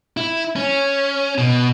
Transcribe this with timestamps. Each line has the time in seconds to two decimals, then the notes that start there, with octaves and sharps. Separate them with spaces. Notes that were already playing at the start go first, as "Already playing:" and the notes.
0.17 E4
0.56 C#4
1.38 B2